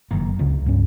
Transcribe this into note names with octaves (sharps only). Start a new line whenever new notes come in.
F#1 F#2 D#3 A#3
D1 C#2 C#3
G2 B3 C#4